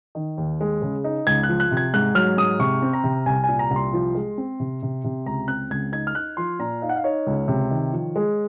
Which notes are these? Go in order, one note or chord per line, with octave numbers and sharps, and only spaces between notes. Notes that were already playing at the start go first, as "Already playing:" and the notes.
D#3
D#2
G#3
C#3
D#4
C#2 G#6
F#6
F3
F#6
C3
G#6
G#2 F#6
F#3 F6
G#2 D#6
C3 C#6
C4
A#5
C3
C2 G#5
A#2 G#5
A#5
C2
C6
F3
G#3
C4
C3
C3
C3
C#2 A#5
C4 F#6
C#2 G#6
D#4 G#6
F6
D#4 F#6
F3 C6
A#2 A#5
D#4 F5
F#5
F5
D#4 C#5
C#2
C3
D#3
F3
G#3